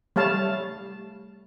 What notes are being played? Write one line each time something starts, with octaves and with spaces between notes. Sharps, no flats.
G3 A3 C#5 F5 A5